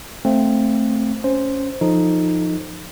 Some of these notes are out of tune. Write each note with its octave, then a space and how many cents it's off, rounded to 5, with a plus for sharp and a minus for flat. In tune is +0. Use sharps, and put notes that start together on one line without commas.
A3 +0 C4 +5 F5 +0
C#4 +0 C5 +0
F3 +0 D#4 +0 A4 +0